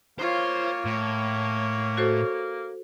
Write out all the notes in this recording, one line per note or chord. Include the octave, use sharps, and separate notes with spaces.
A#3 F4 C5 C#5
A2 C#5
F#4 A4 C5